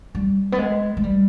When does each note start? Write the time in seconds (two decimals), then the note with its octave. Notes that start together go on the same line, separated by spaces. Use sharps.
0.15 G3
0.52 B3
0.58 G#3
0.97 G#3
1.04 G3